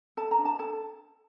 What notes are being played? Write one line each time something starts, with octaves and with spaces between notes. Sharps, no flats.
A4 A5
A#5
D4
A5
A4 A5